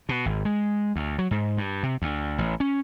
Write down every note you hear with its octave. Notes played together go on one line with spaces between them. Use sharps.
B2
G#1
G#3
D2
F#3
G#2
G2
C3
D2
A1
C#4